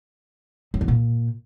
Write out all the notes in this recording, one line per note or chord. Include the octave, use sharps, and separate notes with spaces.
F#3
E2
A#2